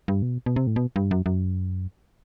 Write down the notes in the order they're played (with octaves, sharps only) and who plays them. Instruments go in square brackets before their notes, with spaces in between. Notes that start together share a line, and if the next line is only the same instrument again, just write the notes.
[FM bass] G2
B2
B2
C3
A2
B2
G2
F#2
F#2